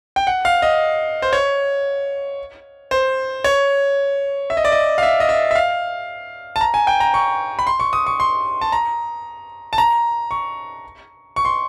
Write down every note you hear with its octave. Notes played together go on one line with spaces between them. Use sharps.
G5
F#5
F5
D#5
C5
C#5
C5
C#5
E5
D#5
D5
D#5
F5
E5
D#5
E5
E5
F5
A5
A#5
G#5
G5
A#5
C#6
B5
C6
C#6
D#6
C#6
C6
A5
A#5
A5
A#5
C#6
C#6
C6